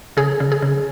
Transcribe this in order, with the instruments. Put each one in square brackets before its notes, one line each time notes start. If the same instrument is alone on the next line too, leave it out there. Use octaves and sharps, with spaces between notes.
[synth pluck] C#3 G#4
C#3
G#4
C#3